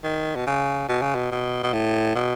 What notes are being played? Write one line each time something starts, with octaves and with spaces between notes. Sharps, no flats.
D#3
B2
C#3
B2
C#3
B2
B2
B2
A2
B2